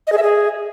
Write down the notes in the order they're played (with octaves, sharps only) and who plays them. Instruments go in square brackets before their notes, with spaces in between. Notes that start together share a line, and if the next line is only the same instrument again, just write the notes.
[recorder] D#5
G#4
E5
G#4